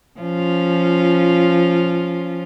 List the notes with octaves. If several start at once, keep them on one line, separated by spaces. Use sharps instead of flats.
F3 C#4 F4